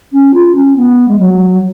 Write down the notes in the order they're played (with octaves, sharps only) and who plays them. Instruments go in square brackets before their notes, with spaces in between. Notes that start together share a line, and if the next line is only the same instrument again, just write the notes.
[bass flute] C#4
F4
C#4
B3
G#3
F#3